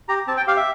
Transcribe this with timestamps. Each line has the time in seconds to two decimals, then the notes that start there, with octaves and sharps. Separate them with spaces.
0.08 G4 A#5
0.27 C4 A5
0.37 G5
0.47 G4 F5
0.57 E5